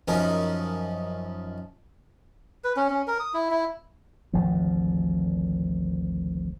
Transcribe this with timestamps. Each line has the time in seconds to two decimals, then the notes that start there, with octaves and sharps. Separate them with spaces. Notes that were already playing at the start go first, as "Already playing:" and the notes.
0.08 F#2 F3 C#4 D#4 A#4
2.64 B4
2.76 C#4
2.90 C#4
3.07 A#4
3.20 D#6
3.34 E4
3.51 E4
4.33 G#1 D2 F3